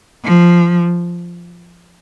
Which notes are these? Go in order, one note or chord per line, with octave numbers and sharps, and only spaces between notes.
F3